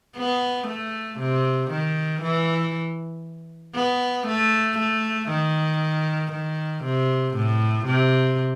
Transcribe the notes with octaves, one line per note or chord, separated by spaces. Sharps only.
B3
A3
C3
D#3
E3
B3
A3
A3
D#3
D#3
C3
A2
C3